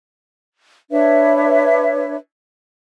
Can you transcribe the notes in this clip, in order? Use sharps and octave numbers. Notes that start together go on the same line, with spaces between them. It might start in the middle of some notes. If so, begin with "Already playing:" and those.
D4 B4 C#5 E5